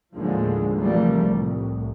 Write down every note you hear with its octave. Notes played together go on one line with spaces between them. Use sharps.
D#2 A2 D3 F3 G#3 A#3
C3 E3 F3 G3 A3 A#3
C2 A2